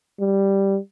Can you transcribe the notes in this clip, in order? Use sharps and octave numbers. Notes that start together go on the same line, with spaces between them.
G3